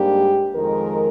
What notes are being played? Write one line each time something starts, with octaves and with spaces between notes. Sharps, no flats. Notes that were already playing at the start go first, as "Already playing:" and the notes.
Already playing: G#2 G3 A#3 D4 G4
F2 D#3 G#3 A#4